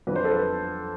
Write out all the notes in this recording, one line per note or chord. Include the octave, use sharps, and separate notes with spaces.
F2 D3 F#3 B4
C5
A4 B4